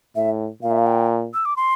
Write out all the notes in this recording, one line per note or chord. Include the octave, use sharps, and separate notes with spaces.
A2 E5
A#2 F5
E5
F5
G5
E6
D6
C6